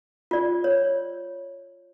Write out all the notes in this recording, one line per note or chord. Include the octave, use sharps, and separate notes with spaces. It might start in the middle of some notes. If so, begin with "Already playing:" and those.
F4 D5
C#5